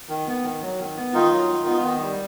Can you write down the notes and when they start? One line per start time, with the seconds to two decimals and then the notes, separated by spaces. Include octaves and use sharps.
0.09 D#3
0.27 B3
0.44 D#3
0.62 F#3
0.79 D#3
0.96 B3
1.13 D#3 D#4 F4
1.31 F#3
1.49 D#3
1.66 B3
1.83 D#3
2.01 G3